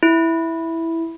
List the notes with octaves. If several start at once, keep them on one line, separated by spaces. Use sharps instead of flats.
E4